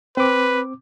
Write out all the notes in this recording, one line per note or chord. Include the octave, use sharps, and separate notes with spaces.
C4 B4 D6